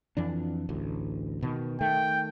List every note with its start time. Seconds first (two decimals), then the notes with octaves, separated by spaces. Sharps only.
0.17 F2 E3 D4
0.69 A1 D2
1.42 B2 D#3
1.81 D#3 A3 G5